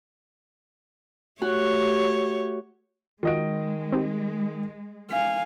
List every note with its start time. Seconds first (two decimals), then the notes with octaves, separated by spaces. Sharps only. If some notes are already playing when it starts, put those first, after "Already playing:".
1.42 A3 F#4 G4 C#5
3.23 D#3 G#3 F4 F#4 D#5 D7
3.92 C4 D#4 G4
5.11 F5 G#5 B6